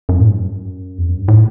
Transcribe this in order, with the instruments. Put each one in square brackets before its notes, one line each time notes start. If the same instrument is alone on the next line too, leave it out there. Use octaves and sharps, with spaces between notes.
[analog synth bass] F#2
A2
G2
F#2
E2
F#2
G2
A2